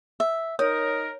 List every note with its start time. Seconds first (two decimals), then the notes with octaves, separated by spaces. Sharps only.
0.20 E5
0.59 D#4 A#4 C#5 D#6